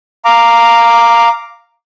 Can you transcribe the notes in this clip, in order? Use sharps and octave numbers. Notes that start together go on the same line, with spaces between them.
F5 A#5 D6